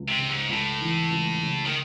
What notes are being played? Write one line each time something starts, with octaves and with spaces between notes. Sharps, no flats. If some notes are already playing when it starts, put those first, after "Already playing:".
Already playing: C#2
C3
C#3
G#2
C#2 A2
E3
C#2
C#3
D#3